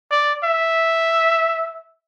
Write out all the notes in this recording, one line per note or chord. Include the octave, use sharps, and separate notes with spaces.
D5
E5